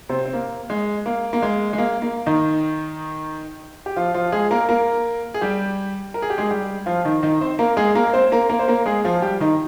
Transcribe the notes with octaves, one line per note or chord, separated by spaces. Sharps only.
C3 C4
C4
A#3
G#3
A#3
A#3
G#3
G#3
A#3
A#3
D#3 D#4
G4
F3 F4
F3 F4
G#3 G#4
A#3 A#4
A#3 A#4
G#4
G3 G4
A#4
G#4
G4
G#3 G#4
G3 G4
F3 F4
D#3 D#4
D#3 D#4
C4 C5
A#3 A#4
G#3 G#4
A#3 A#4
C4 C5
A#3 A#4
A#3 A#4
C5
A#3 A#4
G#3 G#4
F3 F4
G3 G4
D#3 D#4